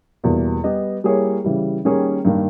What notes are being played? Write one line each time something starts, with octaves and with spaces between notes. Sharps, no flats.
E2 B2 G3 A#3
G3 B3 G4 B4 D#5
G3 A#3 E4 G#4 C#5
C#3 E3 G3
D#3 G3 A#3 C#4 G#4
G2 D#3 A#3